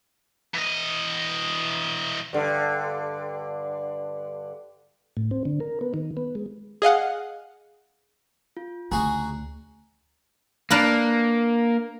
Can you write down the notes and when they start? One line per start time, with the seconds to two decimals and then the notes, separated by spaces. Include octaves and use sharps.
0.54 E3 D#5
2.33 G2 D3
5.17 A2
5.31 C4
5.45 D3
5.60 A#4
5.81 B3
5.94 D#3
6.17 B3
6.35 G#3
6.82 G#4 D#5 F5 F#5
8.57 F4
8.92 D2 C#3 F#4 G#4 A#5
10.71 A#3 D4 A#4 B4